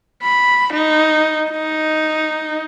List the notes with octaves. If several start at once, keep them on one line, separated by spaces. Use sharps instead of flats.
B5
D#4
D#4